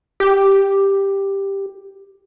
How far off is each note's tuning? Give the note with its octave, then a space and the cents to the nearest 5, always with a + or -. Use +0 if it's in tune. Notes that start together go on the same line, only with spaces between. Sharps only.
G4 +5